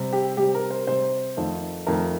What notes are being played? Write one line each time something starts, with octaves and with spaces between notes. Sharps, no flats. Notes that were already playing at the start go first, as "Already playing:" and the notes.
Already playing: C3 G3
G4
C3 G3 G4
A#4
C5
C3 G3 C5
F2 D#3 A3
F2 D#3 A3 A#4